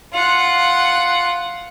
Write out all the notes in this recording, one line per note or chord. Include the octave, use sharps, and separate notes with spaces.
F4 F#5